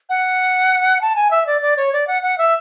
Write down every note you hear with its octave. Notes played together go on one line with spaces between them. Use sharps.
F#5
A5
G#5
E5
D5
D5
C#5
D5
F#5
F#5
E5